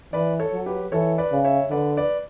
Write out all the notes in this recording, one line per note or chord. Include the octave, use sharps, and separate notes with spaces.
E3 B4 D5
A4 C#5
F#3
G4 B4
E3 A4 C#5
B4 D5
C#3
C#5 E5
D3 B4 D5
B4 D5